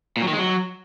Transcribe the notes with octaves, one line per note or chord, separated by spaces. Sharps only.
A#2
F#3
D#3
G#3
F#3